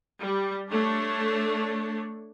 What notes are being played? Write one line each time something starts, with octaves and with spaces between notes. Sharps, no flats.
G3
A3 D4 C#5